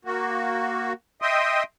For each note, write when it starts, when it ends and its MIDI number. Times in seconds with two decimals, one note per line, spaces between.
0.05 0.93 58
0.05 0.93 66
1.22 1.63 75
1.22 1.63 76
1.22 1.63 79
1.22 1.63 84
1.22 1.63 87